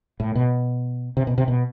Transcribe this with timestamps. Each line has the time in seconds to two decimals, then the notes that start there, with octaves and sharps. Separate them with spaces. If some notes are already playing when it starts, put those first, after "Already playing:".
0.20 A2
0.35 B2
1.17 C3
1.27 B2
1.38 C3
1.48 B2